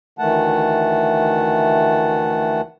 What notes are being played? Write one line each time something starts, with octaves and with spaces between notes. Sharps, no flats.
D2 D#3 E3 A3 F#5 A5